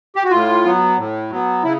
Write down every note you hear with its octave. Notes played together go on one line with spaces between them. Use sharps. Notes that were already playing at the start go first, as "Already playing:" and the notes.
G4
F#4
A2 F4
F#3 B3
A2
F#3 B3
C#3 E4